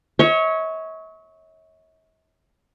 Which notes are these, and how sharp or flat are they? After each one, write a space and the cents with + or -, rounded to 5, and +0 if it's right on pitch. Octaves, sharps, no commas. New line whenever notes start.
C#5 +0 E5 -45